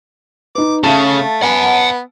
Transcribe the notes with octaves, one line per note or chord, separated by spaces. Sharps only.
D#4 B4 D6
C#3 A3 E5 F5 A5
B3 F#5 G#5